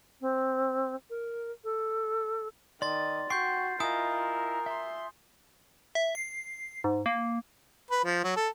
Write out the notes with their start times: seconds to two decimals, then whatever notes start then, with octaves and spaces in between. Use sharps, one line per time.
0.21 C4
1.10 A#4
1.64 A4
2.82 D#3 D5 C6 A6
3.30 F#4 G5 C6 C#6 G6 C7
3.80 E4 F4 A#4 D#5 G#5 D#6
4.66 E5 C6
5.95 E5
6.15 C7
6.84 G#2
7.06 A#3
7.90 B4
8.04 F3
8.24 F#3
8.36 A4